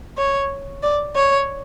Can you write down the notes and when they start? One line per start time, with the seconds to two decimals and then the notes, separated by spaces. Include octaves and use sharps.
0.18 C#5
0.83 D5
1.15 C#5